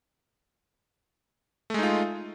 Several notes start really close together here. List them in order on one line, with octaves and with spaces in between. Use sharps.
A3 G#3 D#4 F4